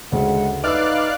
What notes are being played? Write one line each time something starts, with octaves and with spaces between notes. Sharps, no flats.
D2 C#3 G#3 F#5
D#4 B4 D5 E5 F5 D6 E6 F#6